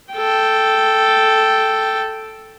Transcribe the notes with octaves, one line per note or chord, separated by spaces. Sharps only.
A4 G5